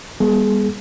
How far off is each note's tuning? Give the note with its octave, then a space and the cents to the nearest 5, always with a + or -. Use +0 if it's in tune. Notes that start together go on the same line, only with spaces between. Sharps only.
G3 +40 B3 -25 G#4 +30